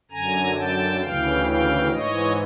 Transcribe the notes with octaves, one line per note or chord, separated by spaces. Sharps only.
F#2 D3 G#5 A#5
G5 A5
D2 C#3 E3 F5 G5
F5 G5
G#2 E3 C#5 D#5